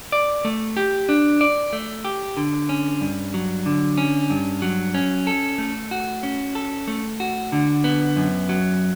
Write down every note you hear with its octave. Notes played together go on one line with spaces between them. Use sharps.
D5
A3
G4
D4
D5
A3
G4
D3
C#4
G2
F#3
D3
C#4
G2
F#3
C#4
A4
A3
F#4
C#4
A4
A3
F#4
D3
B3
F#2
F#3